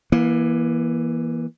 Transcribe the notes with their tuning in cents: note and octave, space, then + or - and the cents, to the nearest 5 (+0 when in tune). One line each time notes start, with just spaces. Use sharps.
E3 +0 A#3 +30